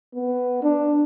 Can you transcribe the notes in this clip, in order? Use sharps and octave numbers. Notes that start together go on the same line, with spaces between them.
B3
D4